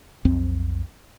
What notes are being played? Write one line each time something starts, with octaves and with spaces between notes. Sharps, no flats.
B1 F2 C4